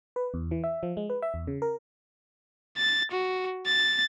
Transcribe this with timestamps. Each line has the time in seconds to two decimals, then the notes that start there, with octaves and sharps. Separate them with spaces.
0.16 B4
0.34 E2
0.51 E3
0.64 E5
0.83 F3
0.97 G#3
1.10 B4
1.22 E5
1.34 E2
1.47 C#3
1.62 A#4
2.78 A6
3.11 F#4
3.66 A6